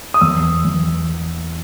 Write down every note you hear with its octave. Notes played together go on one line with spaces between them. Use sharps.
D#6
E2 E6
E2